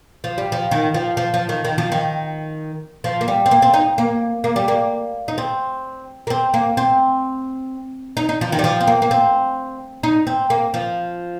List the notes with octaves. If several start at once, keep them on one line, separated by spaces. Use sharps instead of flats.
F3
G3
F3
D#3
F3
F3
F3
D#3
D#3
F3
D#3
F3
A#3
G3
C4
A#3
C4
D#4
A#3
A#3
G3
A#3
D#4
C4
A#3
C4
A#3
C4
D#4
D#4
F3
D#3
G3
F3
C4
A#3
A#3
C4
D#4
C4
A#3
F3